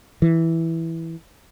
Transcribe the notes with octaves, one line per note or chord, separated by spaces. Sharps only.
E3